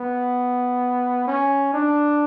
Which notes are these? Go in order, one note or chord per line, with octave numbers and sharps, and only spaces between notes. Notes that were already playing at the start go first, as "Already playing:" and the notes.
Already playing: B3
C#4
D4